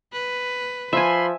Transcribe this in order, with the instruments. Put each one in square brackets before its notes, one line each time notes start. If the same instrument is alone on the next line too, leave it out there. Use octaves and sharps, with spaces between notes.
[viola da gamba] B4
[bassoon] F3 [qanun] E5 G#5 [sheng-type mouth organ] B5 C6